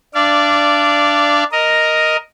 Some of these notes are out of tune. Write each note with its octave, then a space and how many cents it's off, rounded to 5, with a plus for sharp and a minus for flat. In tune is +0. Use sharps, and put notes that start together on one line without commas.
D4 +0 D5 -10 F5 -35
A#4 +0 D#5 +0